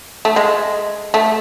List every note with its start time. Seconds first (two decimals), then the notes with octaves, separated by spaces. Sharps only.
0.25 A3
0.36 G#3
1.14 A3